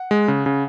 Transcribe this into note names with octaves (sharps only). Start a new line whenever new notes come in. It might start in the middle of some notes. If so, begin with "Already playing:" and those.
Already playing: F#5
G#3
C#3
C#3